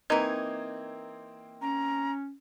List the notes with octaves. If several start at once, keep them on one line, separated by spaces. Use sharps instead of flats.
E3 A#3 C4 D#4 G#6
C#4 A#5